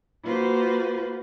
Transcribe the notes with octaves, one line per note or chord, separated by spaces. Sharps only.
A#3 F4 F#4 B4 C5